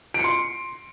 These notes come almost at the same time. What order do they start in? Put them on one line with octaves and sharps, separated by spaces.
D7 C#7 C6